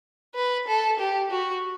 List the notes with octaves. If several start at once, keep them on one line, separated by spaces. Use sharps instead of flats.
B4
A4
G4
F#4